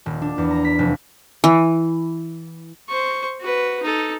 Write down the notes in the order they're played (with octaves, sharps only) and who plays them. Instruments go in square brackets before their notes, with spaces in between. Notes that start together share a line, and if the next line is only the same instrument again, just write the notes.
[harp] D#1
D4
E2
A#5
B6
F1
[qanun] E3
[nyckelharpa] C5 C#6
F#4 B4
D#4 A4